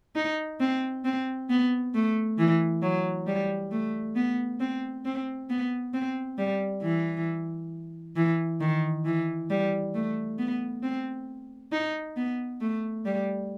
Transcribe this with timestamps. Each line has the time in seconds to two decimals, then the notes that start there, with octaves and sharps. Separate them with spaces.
0.16 D#4
0.60 C4
1.05 C4
1.50 B3
1.94 A3
2.38 E3
2.82 F#3
3.27 G3
3.72 A3
4.16 B3
4.60 C4
5.05 C4
5.50 B3
5.94 C4
6.38 G3
6.82 E3
8.16 E3
8.60 D#3
9.05 E3
9.50 G3
9.94 A3
10.39 B3
10.83 C4
11.72 D#4
12.16 B3
12.61 A3
13.05 G3